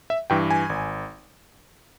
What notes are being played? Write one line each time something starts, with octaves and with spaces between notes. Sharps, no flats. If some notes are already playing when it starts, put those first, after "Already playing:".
E5
G2 E3 G5
G#5
G#1